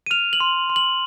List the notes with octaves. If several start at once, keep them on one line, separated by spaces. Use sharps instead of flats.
D#7
F6 F7
F#7
C6
C6
F#7